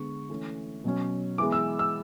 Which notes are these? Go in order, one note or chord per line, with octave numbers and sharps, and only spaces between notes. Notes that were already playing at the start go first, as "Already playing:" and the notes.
Already playing: D3 G#3 B3 C#6
E3 A3 C#4
B2 F#3 C#4
E3 G#3 B3 D6
E6
E6